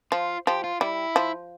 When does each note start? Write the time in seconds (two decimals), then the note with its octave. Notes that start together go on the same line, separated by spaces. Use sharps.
0.12 F3 F4
0.47 F3 G4
0.64 F4
0.81 G3 E4
1.16 F3